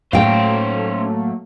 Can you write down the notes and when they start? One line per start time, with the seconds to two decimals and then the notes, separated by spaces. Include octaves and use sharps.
0.13 A2 F#3 A3 A#3 C#4 C5 F5 G5